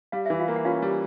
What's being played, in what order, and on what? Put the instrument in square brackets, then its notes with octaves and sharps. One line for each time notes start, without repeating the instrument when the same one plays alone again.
[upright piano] G3 [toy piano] F5
[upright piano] E3 [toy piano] E5
[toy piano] F4 F5
[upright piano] A#3
[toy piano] F#5
[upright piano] C#4 [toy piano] F4 F5
[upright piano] G3